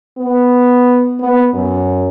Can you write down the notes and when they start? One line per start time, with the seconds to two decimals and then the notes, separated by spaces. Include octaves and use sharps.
0.18 B3
1.20 B3
1.54 F#2